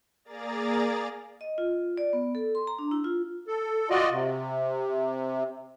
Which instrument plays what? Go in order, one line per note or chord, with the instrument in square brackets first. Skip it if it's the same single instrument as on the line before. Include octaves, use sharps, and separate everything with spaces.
[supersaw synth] A#3 G#4 D5 A#5 A6
[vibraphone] D#5
F4
D5
B3
A4
C6
A#5
D4
E4
F4
[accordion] A4
F4 F#4 D5 D#5
C3